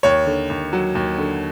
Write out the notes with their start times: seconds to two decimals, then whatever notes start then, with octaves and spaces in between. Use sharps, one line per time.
0.03 D#2 C#5
0.26 D3
0.50 D#2
0.73 F#3
0.95 D#2
1.18 D3